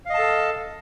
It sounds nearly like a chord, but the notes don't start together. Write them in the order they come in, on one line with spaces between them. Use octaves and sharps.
F5 D#5 A5 A4